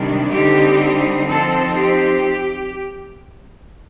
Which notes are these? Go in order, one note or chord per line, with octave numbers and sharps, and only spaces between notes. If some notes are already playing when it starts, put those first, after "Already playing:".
Already playing: C3 D#3 G3 D4
D3 G3 C4 D#4 G4
F3 C4 D#4 A4
G4